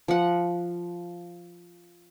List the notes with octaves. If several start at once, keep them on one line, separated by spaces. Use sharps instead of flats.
F3 F#5